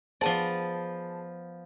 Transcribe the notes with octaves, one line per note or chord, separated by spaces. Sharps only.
F3 B3 G#4 C5 D5 A5